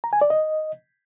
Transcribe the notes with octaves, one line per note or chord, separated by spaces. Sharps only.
A#5
G#5
D5
D#5